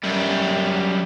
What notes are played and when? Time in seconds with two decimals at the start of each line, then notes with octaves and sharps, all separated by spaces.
0.04 F#2 G3